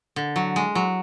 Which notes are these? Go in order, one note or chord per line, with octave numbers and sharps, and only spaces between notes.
D3
F#3
G#3
F#3